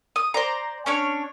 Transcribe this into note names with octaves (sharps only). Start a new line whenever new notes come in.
D#6
C5 D5 A#5
C#4 D4 C#5